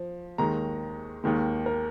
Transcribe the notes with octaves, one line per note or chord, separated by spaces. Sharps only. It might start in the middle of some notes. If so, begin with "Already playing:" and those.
Already playing: F3
D#2 D#3 G#3 A#5
D#2 D#3 G#3
A#4